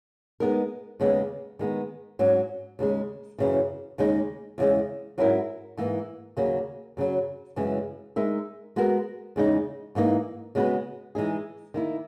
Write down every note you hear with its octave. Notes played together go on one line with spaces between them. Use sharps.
G#3 B3 D#4 A#4
D#2 C#3 G#3 B3
D#3 G#3 B3
G#2 F#3 C#4
D#2 C#3 G#3
F#2 C#3 E3
D#2 C#3 G#3 D#4
E2 C#3 G#3
G#2 F#3 C#4 E4 A#4
G#2 E3 A#3
D#2 C#3 F#3 A#3 C#4
F#2 C#3 F#3
F#2 C#3 E3 G#3 C#4
G#3 D#4 A#4 E5
G#3 B3 F#4 A#4
E2 C#3 G#3 D#4
G#2 E3 A#3 D#4
C#3 G#3 B3 F#4 B4
E3 G#3 D#4 G#4
D#3 A#3 E4